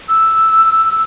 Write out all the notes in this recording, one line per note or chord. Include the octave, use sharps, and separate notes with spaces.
E6